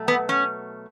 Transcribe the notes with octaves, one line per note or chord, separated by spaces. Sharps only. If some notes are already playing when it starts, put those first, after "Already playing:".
Already playing: B2 F#3 A3
B3
C#4